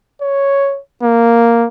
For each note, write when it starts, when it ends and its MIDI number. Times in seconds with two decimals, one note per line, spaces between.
0.22 0.79 73
1.03 1.68 58